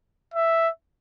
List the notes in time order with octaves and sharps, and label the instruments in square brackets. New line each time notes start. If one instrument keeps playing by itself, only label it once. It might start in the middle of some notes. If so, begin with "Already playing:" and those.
[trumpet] E5